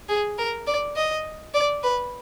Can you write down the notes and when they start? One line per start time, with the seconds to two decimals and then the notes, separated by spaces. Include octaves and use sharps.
0.09 G#4
0.38 A#4
0.67 D5
0.96 D#5
1.54 D5
1.83 B4